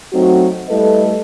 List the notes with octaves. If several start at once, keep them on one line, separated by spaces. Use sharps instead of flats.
F#3 A3 C4 D#4 F#4
G3 A3 E4 A4 B4 D#5